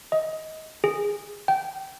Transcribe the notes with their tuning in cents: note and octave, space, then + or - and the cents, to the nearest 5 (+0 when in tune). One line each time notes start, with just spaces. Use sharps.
D#5 +20
G#4 -20
G5 -25